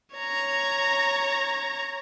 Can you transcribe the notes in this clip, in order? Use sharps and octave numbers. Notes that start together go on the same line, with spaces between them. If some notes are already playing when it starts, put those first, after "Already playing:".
C#5 A#5